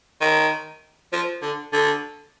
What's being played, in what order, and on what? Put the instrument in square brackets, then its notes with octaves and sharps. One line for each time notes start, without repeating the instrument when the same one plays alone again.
[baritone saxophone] D#3
F3
D3
D3